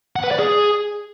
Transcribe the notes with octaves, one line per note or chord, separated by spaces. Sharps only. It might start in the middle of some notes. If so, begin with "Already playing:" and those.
F#5
B4
D5
G#4